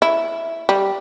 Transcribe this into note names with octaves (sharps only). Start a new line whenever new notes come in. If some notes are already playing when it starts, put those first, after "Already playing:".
E4
G3